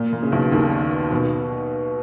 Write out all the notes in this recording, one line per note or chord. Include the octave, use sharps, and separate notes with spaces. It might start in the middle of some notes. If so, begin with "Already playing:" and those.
Already playing: A#2
A#2
C#3
B1 B2
D#2 D#3
B2 B3